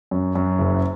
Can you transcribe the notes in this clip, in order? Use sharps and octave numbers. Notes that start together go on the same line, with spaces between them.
F#2
F#2
F#1